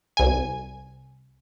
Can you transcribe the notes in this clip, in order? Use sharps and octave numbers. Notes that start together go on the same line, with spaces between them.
C2 G#5